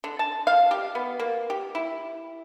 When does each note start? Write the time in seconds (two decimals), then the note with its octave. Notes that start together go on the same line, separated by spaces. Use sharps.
0.04 D3
0.19 A5
0.47 F5
0.71 G4
0.95 B3
1.20 A#3
1.50 G4
1.75 E4